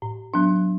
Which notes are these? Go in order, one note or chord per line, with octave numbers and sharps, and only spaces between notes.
A2
F#3 B3 D4